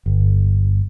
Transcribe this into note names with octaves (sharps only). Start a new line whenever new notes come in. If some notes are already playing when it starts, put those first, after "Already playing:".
G1